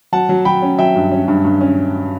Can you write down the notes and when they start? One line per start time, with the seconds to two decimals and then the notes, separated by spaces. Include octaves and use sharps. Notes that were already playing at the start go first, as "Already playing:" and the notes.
0.12 F#3 F#5 A5
0.29 F#3
0.45 F#3 G5 B5
0.62 C#4
0.79 F#3 E5 G5
0.96 G2
1.12 C#4
1.28 G2
1.45 G2
1.61 C#4